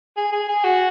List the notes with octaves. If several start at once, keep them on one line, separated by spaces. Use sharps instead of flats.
G#4
G#4
G#4
F#4